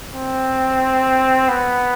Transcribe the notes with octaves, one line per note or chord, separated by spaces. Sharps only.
C4
B3